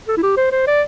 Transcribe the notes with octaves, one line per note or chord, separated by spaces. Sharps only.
A4
E4
G4
C5
C5
D5